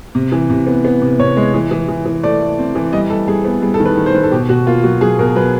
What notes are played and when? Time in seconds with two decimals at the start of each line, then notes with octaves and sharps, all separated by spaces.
0.15 C3
0.32 E3
0.50 C3
0.67 B3
0.85 B3
1.02 C3
1.19 C3 C#5
1.37 G#3
1.54 E3
1.71 E3
1.89 E3
2.05 E3
2.23 A3 D5
2.41 A3
2.58 C4
2.75 E3
2.93 G3 D#5
3.10 G3 A4
3.28 G3 G#4
3.45 B3
3.62 G3 G#4
3.74 A4
3.80 D#3
3.85 B4
3.97 D#3
4.06 C5
4.14 D#3 B4
4.23 A4
4.32 B2 G4
4.49 B2 F#4
4.67 A#3 F4
4.84 F#3 F#4
5.01 F#3 G#4
5.19 B2 A#4
5.36 F#3 B4